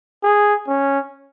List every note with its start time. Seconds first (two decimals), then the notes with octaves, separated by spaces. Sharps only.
0.24 G#4
0.68 C#4